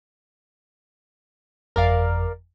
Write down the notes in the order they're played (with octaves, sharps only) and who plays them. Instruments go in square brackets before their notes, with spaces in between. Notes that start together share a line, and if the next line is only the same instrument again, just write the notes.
[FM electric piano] G1 F2 [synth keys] A#4 D5 F5